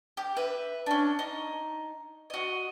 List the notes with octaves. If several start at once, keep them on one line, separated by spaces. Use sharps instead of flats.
G4
B4 E5
C#4 D4
D#4
F#4 D#5